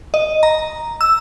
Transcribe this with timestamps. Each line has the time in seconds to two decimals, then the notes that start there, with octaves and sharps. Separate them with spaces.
0.14 D#5
0.43 A#5
1.01 E6